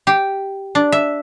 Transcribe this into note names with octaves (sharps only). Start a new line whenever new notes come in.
G4
D4
E5